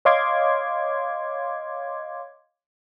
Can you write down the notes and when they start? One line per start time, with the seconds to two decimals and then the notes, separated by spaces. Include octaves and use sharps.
0.05 C#5 D#5 F5 C6 D6 G#6